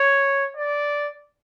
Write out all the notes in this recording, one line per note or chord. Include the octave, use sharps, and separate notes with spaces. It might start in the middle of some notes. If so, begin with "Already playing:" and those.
Already playing: C#5
D5